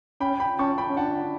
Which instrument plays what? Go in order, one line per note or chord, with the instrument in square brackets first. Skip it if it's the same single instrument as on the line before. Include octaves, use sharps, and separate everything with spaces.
[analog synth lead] C#4 [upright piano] G5 B5
[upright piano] G5 B5
[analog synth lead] C#4 [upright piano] A5 C#6
[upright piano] G5 B5
[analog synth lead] C#4
[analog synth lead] D4 [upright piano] F#5 A5